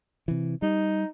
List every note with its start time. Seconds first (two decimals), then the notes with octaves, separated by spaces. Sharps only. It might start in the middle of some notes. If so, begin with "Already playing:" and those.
0.28 C3 E3
0.62 G3 D#4